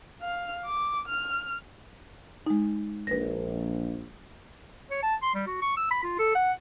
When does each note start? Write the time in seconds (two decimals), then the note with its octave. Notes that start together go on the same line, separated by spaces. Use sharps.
0.21 F5 F6
0.66 D6
1.08 F6
2.46 G#3 D#4
3.07 A#1 B4 A#6
4.90 C#5
5.02 A5
5.22 C6
5.35 G3
5.47 F#4
5.62 C#6
5.77 E6
5.91 B5
6.03 F4
6.19 A4
6.35 F#5